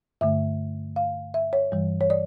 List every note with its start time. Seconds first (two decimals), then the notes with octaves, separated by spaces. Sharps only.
0.21 G2 D3 A3 E5
0.96 F5
1.34 E5
1.53 C#5
1.72 G2 E3 G3
2.01 C#5
2.10 D5